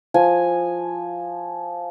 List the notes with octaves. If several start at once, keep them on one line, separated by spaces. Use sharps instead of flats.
F3 G#5